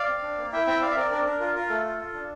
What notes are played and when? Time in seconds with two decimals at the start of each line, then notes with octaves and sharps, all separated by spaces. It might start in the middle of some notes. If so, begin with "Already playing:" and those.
Already playing: D5 F5
0.09 C4
0.23 D4
0.38 A#3
0.52 E4 E5 G5
0.67 C4 E5 G5
0.82 C4 D5 F5
0.90 E5
0.96 C4 A#4 D5
1.11 D4 A#4 D5
1.25 D4 A#4
1.40 F4 A#4
1.55 F4 A#4
1.69 A3 A4
1.84 F4
1.99 F4
2.14 D4